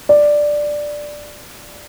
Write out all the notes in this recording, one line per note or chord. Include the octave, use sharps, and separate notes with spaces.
D5